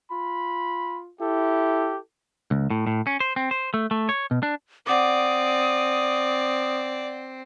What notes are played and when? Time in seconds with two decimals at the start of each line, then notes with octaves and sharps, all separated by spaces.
0.11 F4 B5
1.21 E4 G4 A4
2.51 C#2
2.70 A2
2.87 A2
3.07 C#4
3.20 C5
3.36 C4
3.51 C5
3.74 A3
3.91 A3
4.09 C#5
4.31 B2
4.43 D4
4.87 C4 D5 F#5 D6 D#6